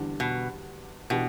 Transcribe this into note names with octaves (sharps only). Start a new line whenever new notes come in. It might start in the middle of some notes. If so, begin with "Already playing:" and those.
Already playing: E2 D3 G3 D4
B2
B2 E3 B3 D4 G4